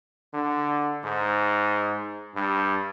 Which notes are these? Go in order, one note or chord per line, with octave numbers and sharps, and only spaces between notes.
D3
G#2
G2